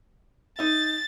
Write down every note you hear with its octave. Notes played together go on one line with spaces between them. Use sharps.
D#4 E5 A6